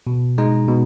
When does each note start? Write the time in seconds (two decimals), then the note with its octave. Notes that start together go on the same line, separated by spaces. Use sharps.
0.07 B2
0.38 G#3 D#4
0.68 B2